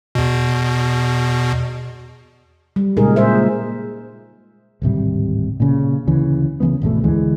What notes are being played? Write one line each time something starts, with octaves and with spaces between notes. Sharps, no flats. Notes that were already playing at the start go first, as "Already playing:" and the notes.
E2 B2
G3
A#2 C#3 G#3 D#4 G#4 A#4
A#2 G#3 C5 E5
D1 G#1 C3 G3
A#2 C#3
D2 C#3 E3 C#4
C#3 E3 A3 B3
G#1 E2 B2 A3
D2 D3 E3 G#3